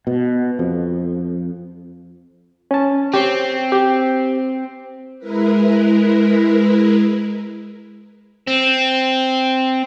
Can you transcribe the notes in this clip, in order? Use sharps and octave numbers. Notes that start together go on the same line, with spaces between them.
B2
F2
C#4 A5
C4 G4 C#5
G4
G#3 E4 A#4 B4
C4